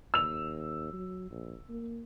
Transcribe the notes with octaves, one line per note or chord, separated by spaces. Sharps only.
D#2 E6 F7
F#3
A#1
A#3